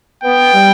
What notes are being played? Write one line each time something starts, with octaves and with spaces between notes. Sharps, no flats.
B3 G5
G3